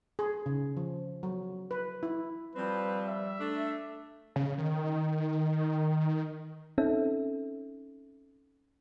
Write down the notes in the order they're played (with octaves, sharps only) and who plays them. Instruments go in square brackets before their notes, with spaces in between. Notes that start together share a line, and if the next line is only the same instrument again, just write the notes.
[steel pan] G#4
C#3
F3
F#3
B4
E4
[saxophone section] F3 C4 [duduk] G3 [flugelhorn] B4
[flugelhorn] E5
[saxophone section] A3 D4
[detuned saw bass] C#3
D#3
[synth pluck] C4 C#4 D#4 A4 E5